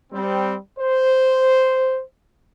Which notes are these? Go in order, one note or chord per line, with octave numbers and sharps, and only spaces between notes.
G3 C4
C5